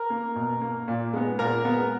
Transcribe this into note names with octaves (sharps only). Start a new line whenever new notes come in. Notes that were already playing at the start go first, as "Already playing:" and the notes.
Already playing: A#4 A#5
A#3
B2
A#3
A#2
G#3 B3
A#2 A#4 A#5
G#3 B3